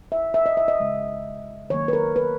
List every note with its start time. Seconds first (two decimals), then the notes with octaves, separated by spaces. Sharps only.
0.12 E5
0.34 E5
0.46 D#5
0.57 E5
0.68 D#5
0.80 C#3 G#3
1.70 D#3 F#3 A#3 C#5
1.88 B4
1.93 A#4
2.16 B4